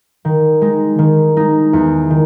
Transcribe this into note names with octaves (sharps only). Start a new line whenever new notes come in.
D#3
G#3 D#4
D#3
G#3 D#4
E2
D#3